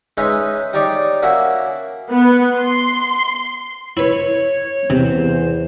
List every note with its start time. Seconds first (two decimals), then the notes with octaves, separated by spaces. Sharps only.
0.17 G#3 C#4 D#4 B4 C#5 E5
0.73 G3 D#4 C#5 D5
1.23 A#3 C#4 F#4 E5 F#5
2.09 B3
2.56 C6
3.97 E4 B4 C#5
4.90 E2 C3 C5